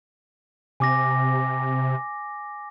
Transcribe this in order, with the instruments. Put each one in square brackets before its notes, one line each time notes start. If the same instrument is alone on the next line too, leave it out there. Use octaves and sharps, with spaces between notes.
[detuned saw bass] C3 [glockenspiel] G#5 D6 A#6